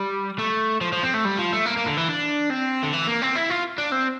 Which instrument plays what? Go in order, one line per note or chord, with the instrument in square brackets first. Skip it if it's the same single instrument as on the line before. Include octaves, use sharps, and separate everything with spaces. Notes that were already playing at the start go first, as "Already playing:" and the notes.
Already playing: [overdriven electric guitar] G3
A3
F3
F3
C4
A3
G3
F3
A3
A#3
A#3
D3
E3
D4
C4
D3
E3
A#3
C4
E4
F4
D4
C4